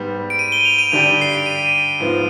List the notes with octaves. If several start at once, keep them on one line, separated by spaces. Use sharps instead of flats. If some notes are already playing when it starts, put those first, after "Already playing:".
Already playing: G#2 G3 B3
D7
D#7
G7
F7
D#7
G2 D3 G3 D4 G4 D7
C7
D7
D#7
G#2 F3 B3 F4